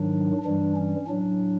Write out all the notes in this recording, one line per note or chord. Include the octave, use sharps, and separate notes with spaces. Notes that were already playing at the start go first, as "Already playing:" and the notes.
Already playing: G#2 D#3 F#3 D4
G2 E3 G3 D4
C#4
A2 F#3 D4